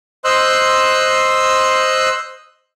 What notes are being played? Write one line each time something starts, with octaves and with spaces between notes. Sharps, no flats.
C5 D#5 C6 E6 F#6